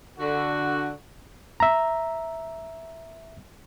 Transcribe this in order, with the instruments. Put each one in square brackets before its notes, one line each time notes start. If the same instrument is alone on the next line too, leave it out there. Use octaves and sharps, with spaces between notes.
[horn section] D3 F#4
[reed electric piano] E5 A#5